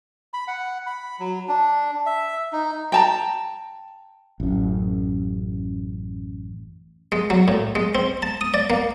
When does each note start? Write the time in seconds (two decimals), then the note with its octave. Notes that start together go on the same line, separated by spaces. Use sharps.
0.34 B5
0.48 F#5
0.87 B5
1.20 F#3
1.48 D4
2.06 E5
2.53 D#4
2.92 G5 A5 A#5
4.40 A1 F#2
7.12 G#3
7.30 F#3
7.48 A2
7.75 G#3
7.95 C4
8.22 A5
8.41 D#6
8.54 D5
8.70 A#3